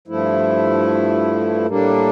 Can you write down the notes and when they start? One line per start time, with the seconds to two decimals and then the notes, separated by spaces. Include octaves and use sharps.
0.08 G2 F3 A3 E4
1.66 A2 G3 A#3 D4